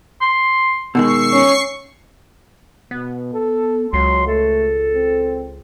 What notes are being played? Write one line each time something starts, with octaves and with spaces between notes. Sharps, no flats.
C6
B2 D#3 G#3 C#6 E6 C7
C#4
B2 B3
A4
C#2 F#3 C6
A3 A4
C4